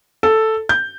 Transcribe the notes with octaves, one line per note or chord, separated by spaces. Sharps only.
A4
G6